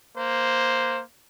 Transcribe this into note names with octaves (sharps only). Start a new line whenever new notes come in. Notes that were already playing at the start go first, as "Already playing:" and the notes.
A#3 C5